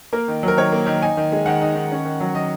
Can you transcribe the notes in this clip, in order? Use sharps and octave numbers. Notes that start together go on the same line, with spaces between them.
A#3 A#4
D#3
F#3 A#4
D#3 C#5
A#3
D#3
D#4 G#5
D#3
G#3
D#3 F#5
D#4
D#3
C#4
D#3
F#3
D#3 D#5